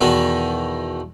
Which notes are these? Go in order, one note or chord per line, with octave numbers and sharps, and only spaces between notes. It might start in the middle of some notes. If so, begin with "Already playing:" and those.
E2 B2 D#3 D#4 E5